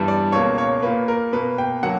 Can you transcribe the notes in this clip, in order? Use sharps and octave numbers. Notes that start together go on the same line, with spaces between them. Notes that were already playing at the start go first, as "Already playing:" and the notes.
Already playing: G2 E3 G3 B3
D5
C#2 B2 A#3 C#5
C#5
A#2 A#3 B4
A#4
B2 A#3 B4
G5
D3 F#3 A#3 F#5